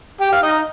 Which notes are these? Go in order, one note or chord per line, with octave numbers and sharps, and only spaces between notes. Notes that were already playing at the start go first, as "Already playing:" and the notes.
G4 G5
F5
D#4 D#5